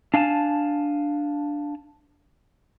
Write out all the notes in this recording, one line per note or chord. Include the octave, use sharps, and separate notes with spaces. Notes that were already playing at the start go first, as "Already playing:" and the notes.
D4 F5 G#5 A5